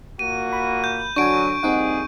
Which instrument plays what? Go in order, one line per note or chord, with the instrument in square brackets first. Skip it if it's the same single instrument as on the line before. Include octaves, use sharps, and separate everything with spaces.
[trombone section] A#2 A#3 F#4 [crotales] D#7
[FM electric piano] B5
[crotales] G6
[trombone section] D3 F#3 [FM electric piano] D4 F#4 G#5 [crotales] C#6 D7
[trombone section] A#1 G3 G#4 [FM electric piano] C4 D#4 F#5